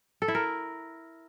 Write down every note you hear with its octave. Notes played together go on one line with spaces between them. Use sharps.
A4
E4
A#4